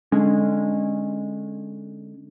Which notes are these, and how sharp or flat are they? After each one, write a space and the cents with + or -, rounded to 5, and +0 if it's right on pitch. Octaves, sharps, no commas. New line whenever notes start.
D3 +0 G#3 +0 C#4 -20